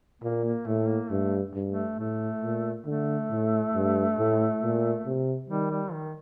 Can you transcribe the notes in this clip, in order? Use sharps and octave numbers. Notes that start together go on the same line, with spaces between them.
A#2 A#3
A#3
A2 A3
A#3
G2 A3
G2
A3
A2 A3
A#2
D3 A3
A2
G2
A2
A#2
C3
D#3 G3
G3
D#3